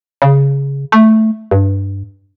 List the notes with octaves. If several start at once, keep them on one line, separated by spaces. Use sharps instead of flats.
C#3
A3
G2